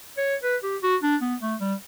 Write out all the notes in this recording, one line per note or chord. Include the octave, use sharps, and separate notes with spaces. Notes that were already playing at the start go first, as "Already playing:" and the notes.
C#5
B4
G4
F#4
D4
B3
A3
G3